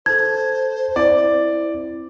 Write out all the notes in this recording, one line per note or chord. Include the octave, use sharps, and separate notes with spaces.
A4 C5 A5 G#6
C4 E4 D5